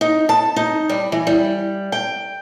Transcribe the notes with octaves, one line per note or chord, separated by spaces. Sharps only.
D#4
A5
D#4
G3
E3
G3
G5